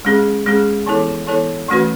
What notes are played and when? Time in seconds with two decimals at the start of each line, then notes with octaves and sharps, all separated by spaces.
0.05 G#3 C#4 G#4
0.46 G#3 C#4 G#4
0.86 E3 B3 E4 A4 C#5
1.27 E3 B3 E4 A4 C#5
1.68 E3 A3 C#4 F#4 B4